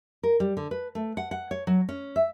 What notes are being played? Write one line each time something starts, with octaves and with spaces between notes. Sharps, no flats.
A#4
G3
D3
B4
A3
F#5
F#5
C#5
F#3
C#4
E5